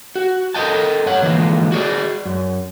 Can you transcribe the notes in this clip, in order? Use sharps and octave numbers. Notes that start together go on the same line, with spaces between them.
F#4
A4 A#4 D5 D#5 G5 A5
G2 C#5 F#5
D3 E3 F3 G#3 A#3
F#4 G#4 D5
F#2